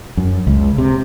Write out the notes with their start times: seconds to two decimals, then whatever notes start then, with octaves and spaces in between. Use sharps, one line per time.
0.17 F#2
0.47 C#2
0.78 C3